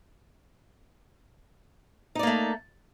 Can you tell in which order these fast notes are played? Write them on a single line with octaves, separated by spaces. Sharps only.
D#4 D5 A#3 A3